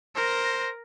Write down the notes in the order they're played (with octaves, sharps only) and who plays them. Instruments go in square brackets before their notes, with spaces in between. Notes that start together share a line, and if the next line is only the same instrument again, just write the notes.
[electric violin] A#4 A#6 [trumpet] C5